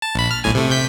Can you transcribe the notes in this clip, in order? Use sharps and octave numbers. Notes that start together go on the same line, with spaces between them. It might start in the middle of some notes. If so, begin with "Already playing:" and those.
A5
A#1 B5
F6
B1 A2 G#5
C3 A3
C3 G6 B6